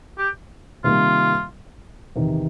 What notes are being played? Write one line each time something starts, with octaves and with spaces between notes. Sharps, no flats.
G4
C3 D#3 G3 A#3 F4
E2 C3 D#3